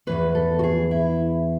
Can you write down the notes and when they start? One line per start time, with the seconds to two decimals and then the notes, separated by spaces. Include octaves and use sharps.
0.07 E2 C#3 E3 B4
0.35 A4
0.59 F#4
0.64 G#4
0.91 E4